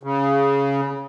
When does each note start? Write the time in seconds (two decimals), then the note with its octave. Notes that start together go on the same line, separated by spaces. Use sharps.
0.03 C#3